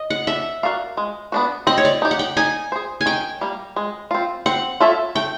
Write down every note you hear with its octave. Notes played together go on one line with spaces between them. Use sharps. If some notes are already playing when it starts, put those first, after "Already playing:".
Already playing: D#5
F#5
D4 E5
F#4 A#4 D5 F5
G#3
B3 D4 F#4
C4 D#5
C#5
D5
D#4 G4
F#5
G5
D#4 G#5
G#4 C5
G#5
D#3 G5
G3 A#3
G#3
C4 F4
C4 F#5
F4 A4 C#5 E5
A3 G5